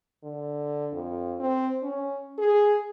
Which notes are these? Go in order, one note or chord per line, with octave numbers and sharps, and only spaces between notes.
D3
F2
C4
C#4
G#4